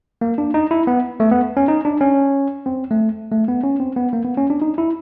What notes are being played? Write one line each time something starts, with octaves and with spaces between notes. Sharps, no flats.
A#3
D4
D#4
E4
B3
A3
B3
C#4
D#4
D4
C#4
C4
A3
A3
B3
C#4
C4
B3
A#3
B3
C#4
D4
D#4
E4